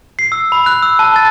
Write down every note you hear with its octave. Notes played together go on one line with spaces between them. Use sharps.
C7
E6
B5
F#6
E6
A5
A6